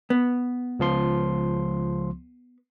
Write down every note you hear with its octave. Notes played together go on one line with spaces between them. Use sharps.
B3
C#2 F3 C6